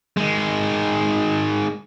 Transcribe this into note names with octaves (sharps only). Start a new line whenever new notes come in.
D#3 G#3